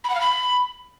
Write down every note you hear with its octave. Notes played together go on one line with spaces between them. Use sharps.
B5
F#5
F5
B5